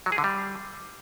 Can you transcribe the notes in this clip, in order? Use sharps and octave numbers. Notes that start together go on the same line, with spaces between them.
F#3
G#4
D3
G3